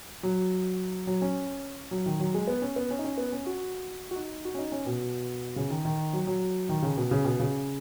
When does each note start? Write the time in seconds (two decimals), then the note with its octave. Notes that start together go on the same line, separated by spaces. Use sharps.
0.23 F#3
1.07 F#3
1.22 C#4
1.91 F#3
2.06 D#3
2.20 F#3
2.34 G#3
2.47 B3
2.62 C#4
2.76 B3
2.91 C#4
2.99 D#4
3.04 C#4
3.18 B3
3.32 C#4
3.46 F#4
4.11 F#4
4.16 D#4
4.45 F#4
4.55 C#4
4.58 D#4
4.72 C#4
4.86 B2
5.56 C#3
5.70 D#3
5.85 D#3
6.13 F#3
6.27 F#3
6.69 D#3
6.82 C#3
6.97 B2
7.11 C#3
7.25 B2
7.40 C#3